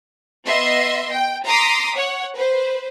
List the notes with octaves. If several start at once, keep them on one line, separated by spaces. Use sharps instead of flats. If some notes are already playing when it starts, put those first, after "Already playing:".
B3 D#5 E5 C6
G5
A#5 C6 D6 D#6 B6 C7
C#5 F#5
B4 C5